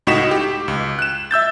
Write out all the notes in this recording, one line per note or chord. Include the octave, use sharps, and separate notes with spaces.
C#2 A2 D#4 F#4 B6 E7
G4
C#2
F#6 E7
E5 E6 G6 A6